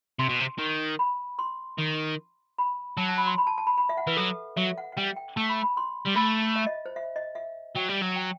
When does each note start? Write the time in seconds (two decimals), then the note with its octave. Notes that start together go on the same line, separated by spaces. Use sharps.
0.19 C3 C6
0.29 B2
0.40 C3
0.58 D#3
0.99 B5
1.39 C6
1.78 D#3
2.58 B5
2.97 F#3 A5
3.08 A5
3.18 B5
3.27 C6
3.38 B5
3.47 A5
3.58 A5
3.67 B5
3.78 B5
3.89 E5
3.97 F#5
4.07 E3 B4
4.17 F#3 A4
4.57 F#3 E5
4.78 F#5
4.92 F#5
4.97 G3 G5
5.16 G5
5.36 A3 A5
5.49 B5
5.63 B5
5.77 C6
6.07 G3
6.16 A3 B5
6.56 E5
6.66 D#5
6.86 C5
6.96 E5
7.16 D#5
7.35 E5
7.76 F#3 G5
7.89 G3
8.02 F#3
8.16 G5